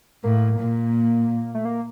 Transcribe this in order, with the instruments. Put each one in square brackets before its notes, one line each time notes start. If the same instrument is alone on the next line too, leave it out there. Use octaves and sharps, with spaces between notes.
[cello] A2 [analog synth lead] A#3
[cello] A#2
[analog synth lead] A3
A#3